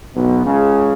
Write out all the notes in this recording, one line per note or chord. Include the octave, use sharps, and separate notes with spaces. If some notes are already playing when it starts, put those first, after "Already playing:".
B1 B2
C#2 C#3